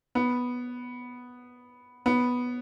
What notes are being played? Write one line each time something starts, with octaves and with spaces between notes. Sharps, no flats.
B3
B3